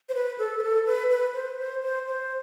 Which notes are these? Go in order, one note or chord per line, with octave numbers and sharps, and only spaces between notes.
C5
B4
A4
B4
A4
B4
B4
C5
C5
C5
C5